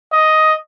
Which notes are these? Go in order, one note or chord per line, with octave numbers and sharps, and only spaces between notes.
D#5